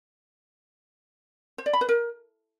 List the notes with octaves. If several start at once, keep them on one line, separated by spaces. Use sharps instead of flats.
C5
D5
B5
B4
A#4